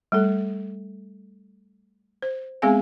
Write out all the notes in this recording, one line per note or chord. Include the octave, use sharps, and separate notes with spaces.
G3 A3 A4
C5
G#3 B3 C4 G#4 F5 G#5